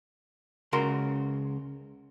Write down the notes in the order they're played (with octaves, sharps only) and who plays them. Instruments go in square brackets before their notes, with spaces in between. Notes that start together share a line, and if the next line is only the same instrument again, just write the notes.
[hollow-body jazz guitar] C#2 C#3 F#4 A#4 C6